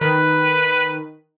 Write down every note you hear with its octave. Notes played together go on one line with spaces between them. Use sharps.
D#3 B4